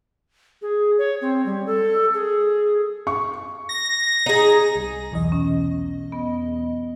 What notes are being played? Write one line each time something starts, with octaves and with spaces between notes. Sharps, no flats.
G#4
C#5
C4
G3
A4
G#4
C#6
A#6
D#4 G#4
C2
B1 E2 D#5
C#4
B3